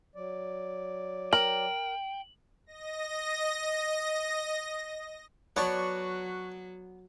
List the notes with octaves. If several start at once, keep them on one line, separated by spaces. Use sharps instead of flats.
F#3 D5
A#4 G5 F#7
D#5 A#6
F#3 B3 C#5 D5 A5 C#6 F#6